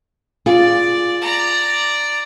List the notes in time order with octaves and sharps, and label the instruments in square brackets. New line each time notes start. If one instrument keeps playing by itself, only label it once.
[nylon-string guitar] F4 G#4 [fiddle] D5
[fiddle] D5 A#5